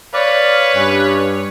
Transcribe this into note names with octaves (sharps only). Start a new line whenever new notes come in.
B4 C#5 D5 F5
G2 C#4